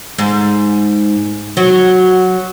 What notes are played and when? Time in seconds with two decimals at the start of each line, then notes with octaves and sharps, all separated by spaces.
0.18 G#2
1.57 F#3